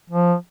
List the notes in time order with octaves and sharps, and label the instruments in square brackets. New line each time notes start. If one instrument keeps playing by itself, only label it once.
[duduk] F3